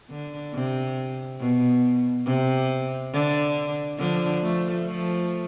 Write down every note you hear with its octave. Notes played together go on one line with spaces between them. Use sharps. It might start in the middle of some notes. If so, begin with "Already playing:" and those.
D3
C3
B2
C3
D3
D3 F3
F3 A3
F3 A3